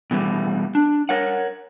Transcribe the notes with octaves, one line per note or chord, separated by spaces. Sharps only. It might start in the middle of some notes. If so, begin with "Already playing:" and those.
B2 E3 G3 A3
D4
A#4 C#5 F#5